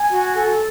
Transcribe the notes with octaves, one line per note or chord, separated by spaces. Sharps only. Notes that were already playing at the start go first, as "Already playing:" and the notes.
Already playing: G#5
F#4
A4